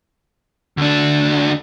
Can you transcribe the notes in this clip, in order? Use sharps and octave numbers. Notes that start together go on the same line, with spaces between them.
D2 D4